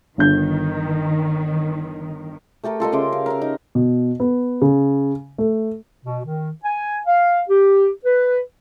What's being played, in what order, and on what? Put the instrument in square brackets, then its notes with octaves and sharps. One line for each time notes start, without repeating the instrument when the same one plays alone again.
[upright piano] G1 G6 [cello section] D#3
[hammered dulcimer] A3 G4 A4 A#4
F4 A4 A#4 D#5
C#3 E5 C6 D6
F5
A#4 E5 F5
D#4
[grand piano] B2
B3
C#3
A3
[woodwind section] B2
D#3
G#5
F5
G4
B4